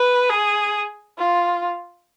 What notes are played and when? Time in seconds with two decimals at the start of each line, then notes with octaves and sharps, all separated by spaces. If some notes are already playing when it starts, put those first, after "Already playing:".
Already playing: B4
0.30 G#4
1.18 F4